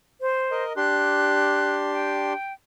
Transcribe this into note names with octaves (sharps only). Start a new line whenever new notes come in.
C5
A#4 D#5
D4 G4 C6 F#6
G5